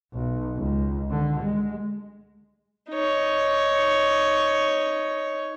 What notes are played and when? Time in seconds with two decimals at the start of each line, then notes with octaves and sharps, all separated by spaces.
0.13 B1
0.56 C#2
1.10 D3
1.41 G#3
2.90 D#4 C#5